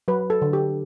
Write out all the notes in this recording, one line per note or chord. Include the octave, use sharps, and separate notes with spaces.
F#3 B4
A4
D3
G4